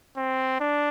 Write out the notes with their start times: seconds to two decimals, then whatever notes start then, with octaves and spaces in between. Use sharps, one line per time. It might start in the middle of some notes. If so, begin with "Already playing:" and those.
0.17 C4
0.60 D4